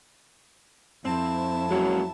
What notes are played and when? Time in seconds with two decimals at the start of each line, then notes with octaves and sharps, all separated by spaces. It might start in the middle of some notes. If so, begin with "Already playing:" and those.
1.05 F2 C4 E4 A5
1.70 F#3 G#3 A#3 C#4